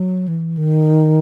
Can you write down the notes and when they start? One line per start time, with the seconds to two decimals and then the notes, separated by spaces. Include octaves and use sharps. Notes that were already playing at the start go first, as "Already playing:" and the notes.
Already playing: F#3
0.28 E3
0.57 D#3